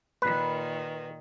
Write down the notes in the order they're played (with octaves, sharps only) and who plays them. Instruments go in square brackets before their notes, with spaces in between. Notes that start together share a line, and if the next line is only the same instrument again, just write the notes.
[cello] A#2 D#3 [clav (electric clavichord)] B4